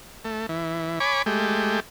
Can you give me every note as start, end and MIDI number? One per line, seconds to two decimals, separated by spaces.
0.25 0.46 57
0.49 0.99 52
1.00 1.22 73
1.00 1.22 80
1.00 1.22 83
1.00 1.22 86
1.26 1.80 56
1.26 1.80 57
1.26 1.80 67